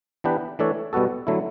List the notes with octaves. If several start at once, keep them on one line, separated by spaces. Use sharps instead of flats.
E3 B3 D4 G4 B4
E3 A3 D4 A4 C#5
B2 G3 B3 F#4 A4
D3 F#3 A3 E4